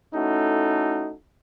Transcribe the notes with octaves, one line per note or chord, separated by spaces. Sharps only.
A3 C#4 D#4 E4 F#4 A4